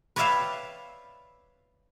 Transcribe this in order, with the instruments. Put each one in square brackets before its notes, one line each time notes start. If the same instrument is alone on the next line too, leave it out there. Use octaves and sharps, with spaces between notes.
[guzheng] B4 C#5 D5 E5 F5 G5